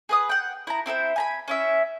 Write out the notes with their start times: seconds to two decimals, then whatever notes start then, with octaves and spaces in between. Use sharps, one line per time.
0.09 G#4 B4 D#6
0.29 F#5 G5
0.67 E4 A#5
0.86 C4 E4 A4 C5
1.16 G#5 A#5 B5
1.48 C#4 E4 E5